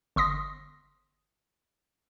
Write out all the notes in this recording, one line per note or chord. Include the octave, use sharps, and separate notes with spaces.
G1 C6 D#6 A#6